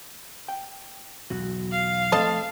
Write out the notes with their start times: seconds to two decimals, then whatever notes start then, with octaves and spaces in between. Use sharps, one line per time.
0.48 G5
1.30 B1 E2 F#4
1.72 F5
2.12 F3 A3 C4 A4 D#5 A5